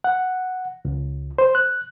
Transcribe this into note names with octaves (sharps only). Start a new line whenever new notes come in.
F#5
C#2
C5
F#6